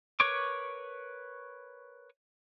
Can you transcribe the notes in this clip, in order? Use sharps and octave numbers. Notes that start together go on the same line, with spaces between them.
A#4 B4 C#5 C#6 D6